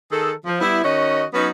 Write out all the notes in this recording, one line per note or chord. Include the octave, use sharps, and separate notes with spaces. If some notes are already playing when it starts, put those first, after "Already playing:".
D#3 G#4 A4
F3
G3 B3 E4
D#3 C#4 F#4 D#5
F#3 B3 C#4 D#4 B4